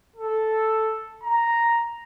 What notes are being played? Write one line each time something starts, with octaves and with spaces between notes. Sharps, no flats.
A4
A#5